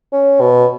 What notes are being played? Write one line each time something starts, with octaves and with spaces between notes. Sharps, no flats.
C#4
B2